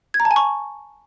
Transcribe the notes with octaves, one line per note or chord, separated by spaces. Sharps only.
G#6
A#5
A5
G#5
C#6